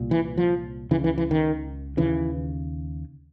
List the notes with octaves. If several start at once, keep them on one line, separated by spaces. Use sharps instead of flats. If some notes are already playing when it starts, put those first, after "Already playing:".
Already playing: C2 A#2
E3
F3
C#2 C#3 E3
E3
E3
D#3
D#2 C#3 E3